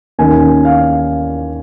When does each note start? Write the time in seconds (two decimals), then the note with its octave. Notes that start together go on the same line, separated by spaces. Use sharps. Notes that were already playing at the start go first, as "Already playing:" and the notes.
0.18 D#2 D#3 A#3 C#4 G#5
0.65 F5